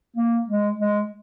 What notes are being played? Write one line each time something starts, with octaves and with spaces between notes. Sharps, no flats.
A#3
G#3
G#3